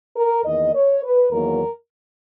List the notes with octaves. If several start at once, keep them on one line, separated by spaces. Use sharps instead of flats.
A#4
E2 D#3 A#3 D#5
C#5
B4
E2 D#3 F#3 A#3 A#4